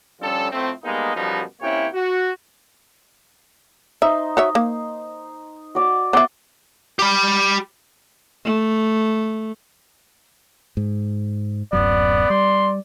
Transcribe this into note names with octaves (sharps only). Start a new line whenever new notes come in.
D3 F3 G3 C#4 A4
F2 A2 A3 C4
G3 G#3 A#3 B3 D#4
F#2 B2 F3 G3 B3 D#4
C3 A#3 C#4 E4 C#5 G5
F#4
D#4 C5 E5
F#4 C#5 E5
A#3
F#4 D5
B3 D5 E5 F#5 C6
G4 B5
A3
G#2
D1 F#2 F#3 B3 D5
G3 C6